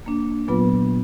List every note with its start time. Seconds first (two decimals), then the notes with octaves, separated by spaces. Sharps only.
0.06 A#3 D4
0.48 A#2 F#3 B3 F4 B4